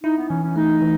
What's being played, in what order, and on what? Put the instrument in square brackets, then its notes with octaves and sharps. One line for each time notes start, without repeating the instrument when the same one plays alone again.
[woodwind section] D#4 [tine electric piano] E4
[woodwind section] B3
[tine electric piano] E3 [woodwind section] C#4
[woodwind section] C#4
[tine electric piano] A3 [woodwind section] D#4
[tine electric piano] E3